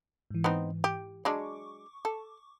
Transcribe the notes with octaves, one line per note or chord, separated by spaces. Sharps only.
G#2 E3
B3 C4 D#4
G4
F#3 G#3 D4 C#6 D6
A4